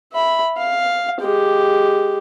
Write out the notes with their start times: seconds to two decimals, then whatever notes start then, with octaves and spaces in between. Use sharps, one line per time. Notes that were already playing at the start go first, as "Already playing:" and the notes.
0.12 E5 B5
0.57 F5
1.21 G#3 G4